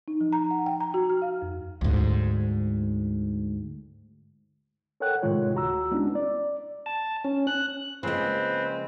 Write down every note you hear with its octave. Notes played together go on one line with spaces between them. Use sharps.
D#4
F3
A#5
F#5
G5
A#5
F#4
F6
F5
F2
D2 G#2
A4 A#4 C#5 F#5 G5 F#6
A2 C3 D#3 G#3 F4 C#5
D2 F#4 A#5 E6
G#3 B3 C#4 D4 E4
D5
A5
C#4
F#6
C#3 F3 G#3 A#3 C4 B4